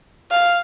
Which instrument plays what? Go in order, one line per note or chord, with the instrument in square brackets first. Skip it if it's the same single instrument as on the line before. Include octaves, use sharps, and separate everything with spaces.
[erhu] F5